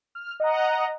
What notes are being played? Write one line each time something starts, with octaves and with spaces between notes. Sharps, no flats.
F6
D#5 F#5 A#5